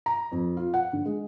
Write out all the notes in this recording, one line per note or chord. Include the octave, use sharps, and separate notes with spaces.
A#5
F2
F4
F#5
D3
G#3